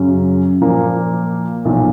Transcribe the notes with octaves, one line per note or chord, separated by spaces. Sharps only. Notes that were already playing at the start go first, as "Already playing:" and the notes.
Already playing: F#2 C#3 F#3 C#4
A#2 F3 A#3
B1 A#2 F3